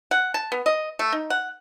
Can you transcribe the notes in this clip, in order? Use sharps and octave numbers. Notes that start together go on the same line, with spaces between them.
F#5
A5
B3
D#5
A3
D#4
F#5